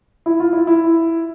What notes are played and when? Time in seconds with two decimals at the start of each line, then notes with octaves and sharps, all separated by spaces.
0.26 E4
0.40 F4
0.53 E4
0.67 E4